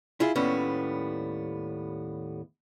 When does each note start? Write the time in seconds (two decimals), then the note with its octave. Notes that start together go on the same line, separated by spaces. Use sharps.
0.20 E4 F4 G#4
0.36 D#2 A2 G3 B3 C#4